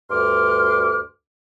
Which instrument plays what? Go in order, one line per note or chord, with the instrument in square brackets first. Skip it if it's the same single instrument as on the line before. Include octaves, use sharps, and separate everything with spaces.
[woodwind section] D2 G2 C6 D6 F6